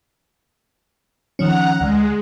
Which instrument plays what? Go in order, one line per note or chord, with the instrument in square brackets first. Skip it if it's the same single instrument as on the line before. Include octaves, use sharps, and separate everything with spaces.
[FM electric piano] D#3 F3 C#4 [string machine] F#5 A#5 F#6
[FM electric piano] D2 [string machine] G#3